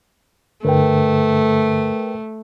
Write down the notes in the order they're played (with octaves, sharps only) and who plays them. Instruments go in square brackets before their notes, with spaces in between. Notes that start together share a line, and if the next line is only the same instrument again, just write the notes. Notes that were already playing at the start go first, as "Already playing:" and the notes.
[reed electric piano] G2 D3 [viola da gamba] A3 [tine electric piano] A#4 B4 G5